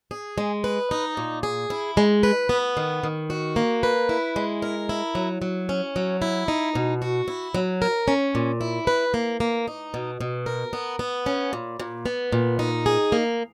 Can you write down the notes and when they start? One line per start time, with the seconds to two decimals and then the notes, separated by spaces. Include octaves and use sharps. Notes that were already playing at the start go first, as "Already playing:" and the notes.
0.11 G#4
0.38 G#3
0.64 B4
0.91 D#4
1.17 A#2
1.43 G#4
1.70 E4
1.97 G#3
2.23 B4
2.49 B3
2.77 D#3
3.03 D#3
3.30 F#4
3.56 A#3
3.83 B4
4.09 E4
4.36 G#3
4.62 A#4
4.89 E4
5.15 F#3
5.42 F#3
5.69 C#4
5.96 F#3
6.22 E4
6.48 D#4
6.75 B2
7.02 F#4
7.28 E4
7.55 F#3
7.82 A#4
8.08 C#4
8.35 A#2
8.61 E4
8.87 B4
9.14 A#3
9.40 A#3
9.67 D#4
9.94 B2
10.21 B2
10.46 A#4
10.73 B3
10.99 B3
11.26 C#4
11.53 A#2
11.80 A#2
12.06 B3
12.33 A#2
12.59 D#4
12.86 G#4
13.12 A#3